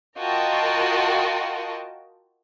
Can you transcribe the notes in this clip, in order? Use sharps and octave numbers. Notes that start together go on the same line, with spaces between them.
F4 F#4 A#4 D#5 G5 A5